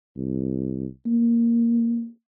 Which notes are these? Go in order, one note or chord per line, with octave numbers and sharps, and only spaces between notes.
C2
A#3